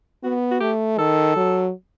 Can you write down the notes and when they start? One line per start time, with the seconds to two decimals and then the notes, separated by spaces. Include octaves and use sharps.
0.23 B3 F#4
0.51 F#4
0.60 A3 G4
0.98 D#3 A4
1.36 F#3